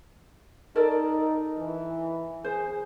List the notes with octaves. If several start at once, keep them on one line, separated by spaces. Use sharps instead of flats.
D#4 A4 A#4 D5
E3
G#4 C5